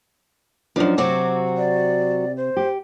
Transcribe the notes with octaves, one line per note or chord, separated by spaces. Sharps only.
F#2 F3 D4 D#4
C3 F#3 C4 F#4 D6
D5
C5
G4